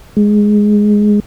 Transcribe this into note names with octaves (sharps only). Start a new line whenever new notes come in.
G#3